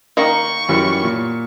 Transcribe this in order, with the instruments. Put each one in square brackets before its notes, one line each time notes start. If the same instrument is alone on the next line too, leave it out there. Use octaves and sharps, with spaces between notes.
[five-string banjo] D#3 A#3 D#5 [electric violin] C#6
[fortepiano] F#2 E3 G3
A#2